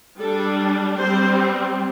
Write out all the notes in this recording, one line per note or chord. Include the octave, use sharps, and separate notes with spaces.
G3 D4 A4
G3 C4 C5